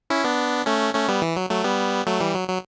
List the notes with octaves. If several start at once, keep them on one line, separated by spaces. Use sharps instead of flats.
C#4 E4
B3 D4
A3 C#4
A3 C#4
G3 B3
E3
F#3
F#3 A3
G3 B3
F#3 A3
E3 G3
F#3
F#3